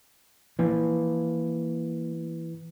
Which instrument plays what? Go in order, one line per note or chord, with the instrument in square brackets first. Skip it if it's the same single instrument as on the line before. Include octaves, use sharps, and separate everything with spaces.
[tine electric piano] E3 [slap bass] F3 A#3